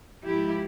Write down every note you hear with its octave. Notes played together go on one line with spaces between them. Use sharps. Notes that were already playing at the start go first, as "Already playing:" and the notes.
G#2 F3 E4 G4